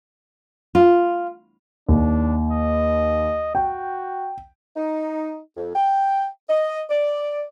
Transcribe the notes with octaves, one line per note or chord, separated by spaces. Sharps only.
F4
D#2 D4
D#5
F#4 G5
D#4
F2
G5
D#5
D5